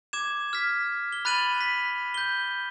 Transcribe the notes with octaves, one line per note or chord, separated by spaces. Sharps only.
D6 G#6 E7
F6 G#6 B6
G7
B5 F#6 A6 D#7 F7 F#7
B6
G6 G7